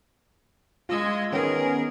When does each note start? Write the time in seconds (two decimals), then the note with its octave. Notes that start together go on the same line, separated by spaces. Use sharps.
0.89 G#3 F4 D#5 E6 G#6
1.33 D#3 B3 C#4 G#4 A#4